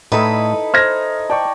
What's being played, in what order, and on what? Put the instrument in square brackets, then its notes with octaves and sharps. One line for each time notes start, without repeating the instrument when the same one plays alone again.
[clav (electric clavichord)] A2 [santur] D#4 E4 D#5 [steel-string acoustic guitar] A4 B4
[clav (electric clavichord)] C5 [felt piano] F6 G#6 A#6
[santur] D5 G5 C#6 [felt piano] A5